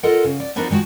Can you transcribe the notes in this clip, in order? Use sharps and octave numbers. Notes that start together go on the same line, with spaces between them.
F4 A4 A#4 C5 D#5 F#5
C#3
D5
F3 B3 D4 D#4 F#4 A#4
D#3 G#3 C#4 F#4 A5